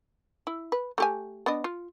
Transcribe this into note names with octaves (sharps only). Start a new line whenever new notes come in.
E4
B4
A3 G4 G#5
B3 D4 D#5
F4